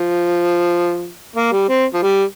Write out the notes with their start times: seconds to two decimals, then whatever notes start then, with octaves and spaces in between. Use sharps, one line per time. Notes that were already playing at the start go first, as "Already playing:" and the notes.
Already playing: F3
1.36 A#3
1.52 G3
1.69 C4
1.94 F3
2.03 G3